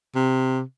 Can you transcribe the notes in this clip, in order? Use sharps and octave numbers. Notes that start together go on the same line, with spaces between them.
C3